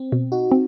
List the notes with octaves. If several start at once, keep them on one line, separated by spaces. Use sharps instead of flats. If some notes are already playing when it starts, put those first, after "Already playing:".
Already playing: C4
B2
D#4 F#4
C4